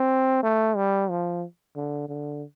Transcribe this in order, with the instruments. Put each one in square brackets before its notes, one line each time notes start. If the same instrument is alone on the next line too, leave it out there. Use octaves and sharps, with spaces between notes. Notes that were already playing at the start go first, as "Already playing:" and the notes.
Already playing: [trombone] C4
A3
G3
F3
D3
D3